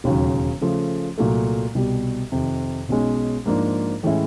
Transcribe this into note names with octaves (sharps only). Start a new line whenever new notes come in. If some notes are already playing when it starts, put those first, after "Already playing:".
E1 D#2 C#3 F#3
C#3 F3 A3
C2 A#2 F#3 A3
C2 B2 G3
F2 C3 D#3
B1 B2 G#3 C#4
G#2 F3 A#3 D4 F4
A2 E3 G#3 C#4 E4